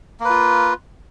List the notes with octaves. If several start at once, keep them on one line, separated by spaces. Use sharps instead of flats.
A#3 F4 B4